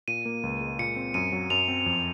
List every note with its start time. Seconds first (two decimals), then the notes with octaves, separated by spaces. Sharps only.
0.08 A#2 D#7
0.25 A#3
0.43 C#2
0.61 G#3
0.79 A#2 C#7
0.96 C4
1.14 F#2 D#7
1.33 F#3
1.50 F#2 F7
1.68 C4
1.86 F2